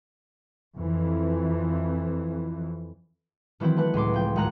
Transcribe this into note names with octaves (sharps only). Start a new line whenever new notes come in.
F2 E3
D#3 E3 F#3 C4 E4
A3 B4 F#5
C#2 A2 C6 D6
F3 G5
G#1 G#3 F#5 A#5 F#6 C#7